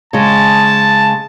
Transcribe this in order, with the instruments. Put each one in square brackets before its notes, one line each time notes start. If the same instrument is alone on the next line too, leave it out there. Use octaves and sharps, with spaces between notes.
[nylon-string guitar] C#3 G#3 [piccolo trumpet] A5